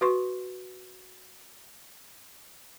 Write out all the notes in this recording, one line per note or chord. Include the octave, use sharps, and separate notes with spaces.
F#4 B4 C6 C#6